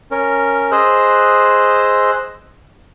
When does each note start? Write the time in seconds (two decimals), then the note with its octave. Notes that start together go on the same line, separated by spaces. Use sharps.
0.11 C#4 A#4
0.72 G#4 C5 D#5 E6 F#6